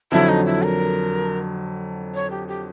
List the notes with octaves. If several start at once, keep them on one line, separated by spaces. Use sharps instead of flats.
F2 D3 F#3 E4
D#4
E4
A#4
C#5
G4
G4